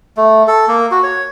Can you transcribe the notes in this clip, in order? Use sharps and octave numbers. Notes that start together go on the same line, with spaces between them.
A3
A4
A#3
F#4
C#5